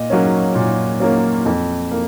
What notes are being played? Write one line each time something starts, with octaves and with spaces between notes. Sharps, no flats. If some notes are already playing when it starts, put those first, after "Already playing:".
Already playing: A#2 D#5
F#3 A#3 C#4
A#2
F#3 A#3 C#4
F2
A#3